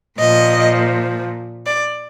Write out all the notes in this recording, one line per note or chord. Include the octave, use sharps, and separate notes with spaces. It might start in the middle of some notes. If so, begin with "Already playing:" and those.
A#2 F3 D#5
D5